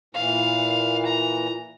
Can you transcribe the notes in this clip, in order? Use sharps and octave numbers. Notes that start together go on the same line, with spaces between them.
A#2 E3 F5
A#5